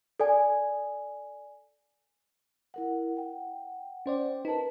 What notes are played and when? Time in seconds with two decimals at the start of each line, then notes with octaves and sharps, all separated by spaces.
0.20 A4 D5 G#5
2.74 E4 A#4 F#5
3.17 F#5 G5
4.06 C#4 C5 D5
4.45 D#4 A#4 B4 A5